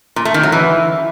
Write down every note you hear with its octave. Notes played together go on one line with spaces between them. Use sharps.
A#2
A3
D#3
F#3
E3